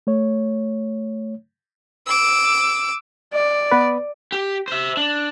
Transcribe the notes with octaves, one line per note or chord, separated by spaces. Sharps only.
A3 C#5
D6 E6
D5
B3 B4
G4
C5 E5
D4